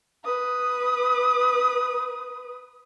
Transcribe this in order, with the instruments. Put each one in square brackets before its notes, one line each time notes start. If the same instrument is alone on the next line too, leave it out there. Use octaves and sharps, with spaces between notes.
[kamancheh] B4 D#6